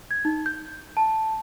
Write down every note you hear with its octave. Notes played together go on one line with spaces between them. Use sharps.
G#6
D#4
G6
A5